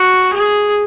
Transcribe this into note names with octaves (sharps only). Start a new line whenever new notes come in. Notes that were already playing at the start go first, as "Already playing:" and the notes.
Already playing: F#4
G#4